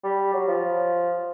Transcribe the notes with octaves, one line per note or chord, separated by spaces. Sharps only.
G3
F#3
F3